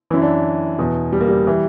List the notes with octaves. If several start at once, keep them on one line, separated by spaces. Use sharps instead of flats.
F#2 E3 E4
D4
E2 B2
G3
A#3
G3
E3